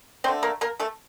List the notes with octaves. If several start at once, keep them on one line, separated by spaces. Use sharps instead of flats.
D3 A3 C4 C5
A#3 A#4
A#3 A#4
A3 A4